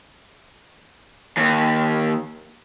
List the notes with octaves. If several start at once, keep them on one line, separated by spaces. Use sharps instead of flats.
D#2